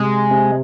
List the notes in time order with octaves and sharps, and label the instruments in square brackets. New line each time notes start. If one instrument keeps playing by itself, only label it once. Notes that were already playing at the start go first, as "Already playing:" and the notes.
Already playing: [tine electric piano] C3 [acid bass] G#3
[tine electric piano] C3